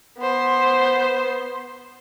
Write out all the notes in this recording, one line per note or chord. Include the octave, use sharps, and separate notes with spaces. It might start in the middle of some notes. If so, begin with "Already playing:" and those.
B3 C5